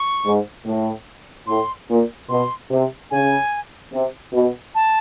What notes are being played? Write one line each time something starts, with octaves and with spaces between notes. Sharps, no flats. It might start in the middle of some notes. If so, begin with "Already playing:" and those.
Already playing: C#6
G#2
A2
A2 C6
A#2
B2 C6
C3
C#3 G#5
C3
B2
A5